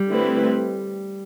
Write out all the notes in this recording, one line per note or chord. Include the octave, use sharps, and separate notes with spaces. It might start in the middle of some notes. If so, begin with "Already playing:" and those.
Already playing: G3
D3 A3 C4 E4 B4